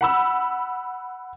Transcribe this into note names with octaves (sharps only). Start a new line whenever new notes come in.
F#5 B5 E6